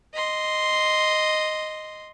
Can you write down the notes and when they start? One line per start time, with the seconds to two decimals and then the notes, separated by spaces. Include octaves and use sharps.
0.14 D#5 C6